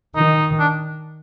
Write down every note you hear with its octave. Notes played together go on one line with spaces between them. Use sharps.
D#3 D#4
D4